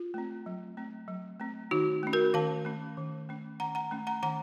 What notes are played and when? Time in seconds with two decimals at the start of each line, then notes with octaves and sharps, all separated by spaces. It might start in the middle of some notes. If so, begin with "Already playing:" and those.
Already playing: F4
0.14 A3 C4
0.46 F#3
0.77 A3 C4
1.08 F#3
1.40 A3 C4
1.71 D#3 D#4 F#4
2.03 A3 C#4
2.13 F#4 A#4
2.34 D#3 F5 A5
2.65 A3 C#4
2.97 D#3
3.29 A3 C#4
3.60 D#3 F#5 A#5
3.75 F#5 A#5
3.91 A3 C#4
4.07 F#5 A#5
4.22 D#3 F#5 A#5